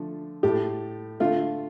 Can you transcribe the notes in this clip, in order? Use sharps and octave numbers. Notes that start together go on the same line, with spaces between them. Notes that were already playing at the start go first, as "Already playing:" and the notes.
Already playing: D3 F3 A3
A2 A3 G4
D3 A3 F4